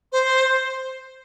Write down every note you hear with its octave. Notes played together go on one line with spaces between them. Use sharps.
C5